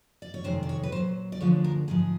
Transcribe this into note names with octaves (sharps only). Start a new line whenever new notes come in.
D5
C#5
F2 C3 D#3 G#3 C5
D5
C#5
B4
A#2 F#3 C5
D5
D2 D3 F3 G#3 C#5
A#4
G#2 F3 G#3 G#4